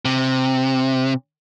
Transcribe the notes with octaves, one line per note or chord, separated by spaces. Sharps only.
C3